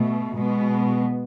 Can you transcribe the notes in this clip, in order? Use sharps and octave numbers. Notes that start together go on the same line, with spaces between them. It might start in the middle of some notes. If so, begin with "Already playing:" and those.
Already playing: B2 A3
B2 G#3 B3